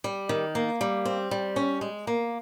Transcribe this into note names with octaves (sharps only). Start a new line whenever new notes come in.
G3
D#3
A#3
G3
C4
G3
C#4
G#3
A#3